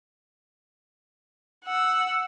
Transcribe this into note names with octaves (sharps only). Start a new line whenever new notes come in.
F#5 E6